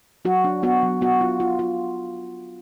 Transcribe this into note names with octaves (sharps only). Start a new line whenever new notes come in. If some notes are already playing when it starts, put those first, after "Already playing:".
F#3 F#4
D4
B3 F#4
F#3
B3 F#4
F4
F4
F4